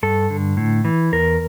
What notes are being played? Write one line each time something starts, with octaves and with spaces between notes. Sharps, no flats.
G2 A4
D3
A2
E3
E2 A#4